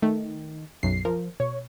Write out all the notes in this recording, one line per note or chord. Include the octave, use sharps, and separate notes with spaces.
D#3 A3
B1 F#2 C7
F3 A#4
B2 C#5